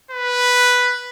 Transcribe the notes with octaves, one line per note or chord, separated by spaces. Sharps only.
B4